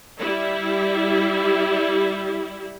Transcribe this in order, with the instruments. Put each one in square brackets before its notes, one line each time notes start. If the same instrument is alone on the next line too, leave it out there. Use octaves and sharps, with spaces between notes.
[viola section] G3 E4